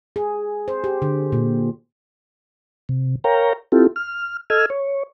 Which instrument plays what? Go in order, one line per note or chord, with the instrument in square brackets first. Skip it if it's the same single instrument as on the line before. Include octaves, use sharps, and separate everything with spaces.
[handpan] G#4
C5
G4
D3
A#2
[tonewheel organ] C3
A#4 C#5 F5 G5 A#5
C4 E4 F4 G4 A4
F6
A4 D#5 E6 F6 G#6
C#5